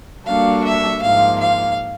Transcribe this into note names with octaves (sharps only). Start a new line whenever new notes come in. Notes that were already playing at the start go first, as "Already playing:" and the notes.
G3 A#3 D4 F#4 A4 F5
E5
G#2 F3 A#3 F5
F5